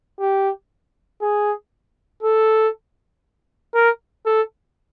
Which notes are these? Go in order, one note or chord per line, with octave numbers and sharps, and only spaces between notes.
G4
G#4
A4
A#4
A4